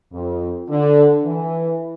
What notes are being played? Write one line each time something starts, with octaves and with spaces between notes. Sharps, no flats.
F2
D3
E3